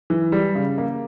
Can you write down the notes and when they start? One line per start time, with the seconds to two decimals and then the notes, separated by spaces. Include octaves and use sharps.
0.10 E3
0.32 G3
0.55 C#3
0.78 A#3